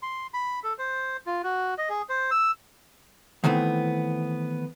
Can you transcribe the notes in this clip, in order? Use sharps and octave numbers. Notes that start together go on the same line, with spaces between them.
C6
B5
A4
C5
F4
F#4
D#5
G#4
C5
E6
D#3 E3 A3 B3 C4